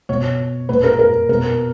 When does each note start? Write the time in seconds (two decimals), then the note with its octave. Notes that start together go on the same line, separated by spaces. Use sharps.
0.09 B2 C#5
0.69 A#2 B4
0.84 A#4
0.99 A#4
1.29 B2 A#4